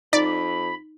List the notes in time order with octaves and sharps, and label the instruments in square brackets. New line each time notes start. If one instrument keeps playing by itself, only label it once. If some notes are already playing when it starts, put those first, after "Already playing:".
[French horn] F2 [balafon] D#4 [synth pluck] D5 [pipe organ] B5